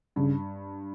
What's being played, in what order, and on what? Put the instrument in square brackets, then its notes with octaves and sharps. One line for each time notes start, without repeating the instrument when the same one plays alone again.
[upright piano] G2 [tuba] C#3